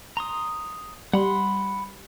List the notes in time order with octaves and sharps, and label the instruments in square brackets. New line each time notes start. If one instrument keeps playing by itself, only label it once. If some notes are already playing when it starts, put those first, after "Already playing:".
[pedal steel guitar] A#5 C6 D#6
[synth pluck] G3 [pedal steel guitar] F#5 B5 C6